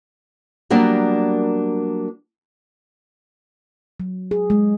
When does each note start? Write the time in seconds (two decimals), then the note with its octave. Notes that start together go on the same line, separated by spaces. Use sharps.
0.70 F#3 G3 A#3 B3 D4 A#4
4.00 F#3
4.31 G#4
4.50 G#3